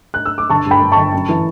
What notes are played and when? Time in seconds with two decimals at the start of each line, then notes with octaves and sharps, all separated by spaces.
0.14 F#6
0.26 E6
0.38 D6
0.50 G1 A5 C#6
0.66 G2
0.71 G5 B5
0.81 G2
0.92 A5 C#6
0.97 G1
1.13 F#2
1.29 E3